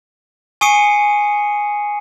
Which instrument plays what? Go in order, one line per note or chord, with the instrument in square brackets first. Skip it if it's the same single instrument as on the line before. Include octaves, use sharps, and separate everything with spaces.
[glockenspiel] G#5 C#6 D#6 C7 C#7 D#7